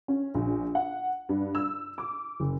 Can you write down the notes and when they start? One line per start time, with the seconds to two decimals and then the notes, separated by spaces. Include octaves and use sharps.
0.08 C#4
0.35 A#1
0.75 F#5
1.29 G2
1.55 E6
1.98 D6
2.40 F#1